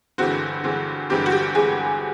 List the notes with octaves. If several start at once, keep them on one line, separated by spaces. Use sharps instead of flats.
G1 G2 E3 G#3 C4 F#4
G1 G2 E3 G#3 C4
G1 G2 E3 G#3 C4 G4
F#4
G4
G1 G2 E3 G#3 C4 G#4